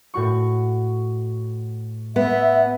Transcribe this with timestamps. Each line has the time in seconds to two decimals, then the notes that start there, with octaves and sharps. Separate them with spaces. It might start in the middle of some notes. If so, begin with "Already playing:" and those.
0.14 A2 F#4 C#6
2.16 B3 E5